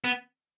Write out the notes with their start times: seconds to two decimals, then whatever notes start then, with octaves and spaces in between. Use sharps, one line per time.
0.04 B3